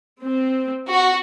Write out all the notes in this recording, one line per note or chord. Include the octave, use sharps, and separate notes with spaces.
C4
F#4